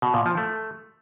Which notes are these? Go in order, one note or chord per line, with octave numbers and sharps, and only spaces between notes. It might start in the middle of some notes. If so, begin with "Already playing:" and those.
B2
A#2
F3
A3